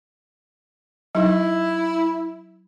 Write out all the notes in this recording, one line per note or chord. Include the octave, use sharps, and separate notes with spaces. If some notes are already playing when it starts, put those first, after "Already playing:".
F#3 D#4 E4